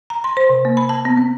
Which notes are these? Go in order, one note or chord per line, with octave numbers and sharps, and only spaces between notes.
A#5
C6
C5
C3
A#3
B5
A5
B3
C4